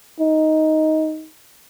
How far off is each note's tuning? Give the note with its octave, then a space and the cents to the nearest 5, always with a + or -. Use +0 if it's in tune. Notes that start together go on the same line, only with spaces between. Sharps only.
D#4 +10